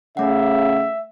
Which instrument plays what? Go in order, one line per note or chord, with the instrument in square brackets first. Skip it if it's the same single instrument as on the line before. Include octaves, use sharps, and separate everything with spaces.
[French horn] C#3 [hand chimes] A3 F#5 [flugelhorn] E5